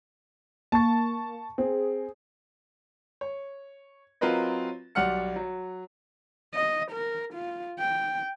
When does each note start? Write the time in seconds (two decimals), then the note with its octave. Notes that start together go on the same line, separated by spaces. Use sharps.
0.72 A#3 A5 C#6 A6
1.58 C4 G#4
3.21 C#5
4.21 F#3 C4 F4 A#4 B4 D#5
4.95 B1 G3 D5 F#5 F6 C#7
5.36 F#3
6.54 D#5
6.91 A#4
7.34 F4
7.79 G5